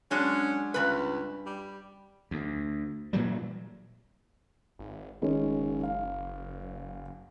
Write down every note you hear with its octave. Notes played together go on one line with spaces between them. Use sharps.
F#3 G#3 C#4 D4
C#2 G2 D#3 B4
G3
D2
A#2 E3 F#3 G3
G#1
F#1 D#3 G#3 C#4
F5